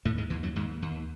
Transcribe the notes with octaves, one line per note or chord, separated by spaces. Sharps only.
D#2 A2 A3
G#2 G#3
D#2 E3
F#2 F#3
D#2 G#2 G#3
D#2